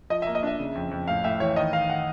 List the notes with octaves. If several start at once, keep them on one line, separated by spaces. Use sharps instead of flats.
F3 D#5
A#3 E5
D#5
D4 E5
C#3
F2
F2
A2 F5
A2 E5
E3 C#5
D#3 D#5
D#3 F5
D#3 F#5